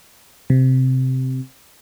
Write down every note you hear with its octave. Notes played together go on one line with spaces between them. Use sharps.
C3